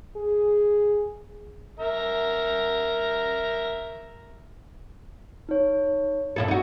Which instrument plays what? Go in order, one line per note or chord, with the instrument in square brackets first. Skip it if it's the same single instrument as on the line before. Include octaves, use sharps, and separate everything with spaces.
[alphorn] G#4
[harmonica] A#4 E5 A#5
[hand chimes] D#4 C#5
[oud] A#2 E4 A4
D#4 F#4